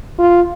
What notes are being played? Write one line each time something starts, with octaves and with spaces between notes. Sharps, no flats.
F4